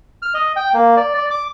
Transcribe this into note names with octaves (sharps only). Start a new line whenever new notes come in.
F6
D#5
G5
A#3
D5
D5
D6